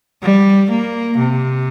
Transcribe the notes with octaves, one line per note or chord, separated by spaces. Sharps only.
G3
A#3
C3